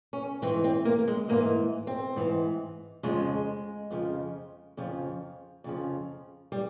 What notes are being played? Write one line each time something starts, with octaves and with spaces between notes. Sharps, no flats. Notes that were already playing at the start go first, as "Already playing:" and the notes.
C#4
G#2 E3 C4
C4
A#3
G#3
G#2 E3 A#3
C4
G#2 E3
F2 C#3 F3 G#3
F2 C#3 F3
F2 C#3 F3
F2 C#3 F3
G3